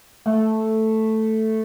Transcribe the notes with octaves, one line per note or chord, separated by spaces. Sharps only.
A3